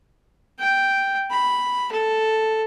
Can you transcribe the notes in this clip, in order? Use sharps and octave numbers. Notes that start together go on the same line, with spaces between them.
G5
B5
A4